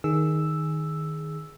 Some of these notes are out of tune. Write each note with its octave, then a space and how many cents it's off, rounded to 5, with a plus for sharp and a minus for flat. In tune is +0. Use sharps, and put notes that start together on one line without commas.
D#3 +0 G#4 +0 E6 +0